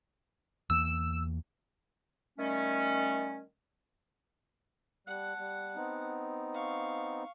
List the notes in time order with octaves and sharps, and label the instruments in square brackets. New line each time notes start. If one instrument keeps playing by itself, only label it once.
[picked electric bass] E2 E3 A#3 [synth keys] E6
[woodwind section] D#3 G3 A3 C#4
[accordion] G3 F#6 [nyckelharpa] F#5 A5
[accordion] G3
B3 C4 D#4
[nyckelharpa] F5 C#6